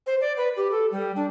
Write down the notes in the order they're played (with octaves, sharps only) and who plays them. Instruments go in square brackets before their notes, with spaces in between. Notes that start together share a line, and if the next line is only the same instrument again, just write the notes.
[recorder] C5
D5
B4
G4
A4
G3
D4